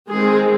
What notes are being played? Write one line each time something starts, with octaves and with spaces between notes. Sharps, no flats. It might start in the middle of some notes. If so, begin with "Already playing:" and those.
D#3 G#3 C4 G#4